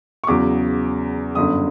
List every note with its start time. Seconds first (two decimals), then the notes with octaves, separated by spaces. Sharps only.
0.24 C#6
0.27 E2 C#3 F#3 D6
1.35 G1 F#2 D3 D#6